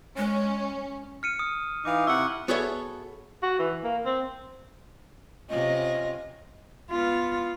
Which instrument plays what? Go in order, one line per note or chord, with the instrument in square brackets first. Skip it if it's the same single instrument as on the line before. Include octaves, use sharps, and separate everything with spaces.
[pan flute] G#3 [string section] C#4
[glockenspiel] F6 C#7 D#7
D#6
[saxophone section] E3 D#4 F5 [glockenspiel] D6
[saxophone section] C3 E4 F#5 [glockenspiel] C#6 E6
[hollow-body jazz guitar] B3 F#4 G#4 A4 C#5 E5
[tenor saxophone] F#4
E3
A#3
C4
[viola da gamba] C3 C#4 F4 [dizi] D#5
[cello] B3 F4